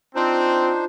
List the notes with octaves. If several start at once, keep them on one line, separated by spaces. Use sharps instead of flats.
C4 D4 D#4 F4 C5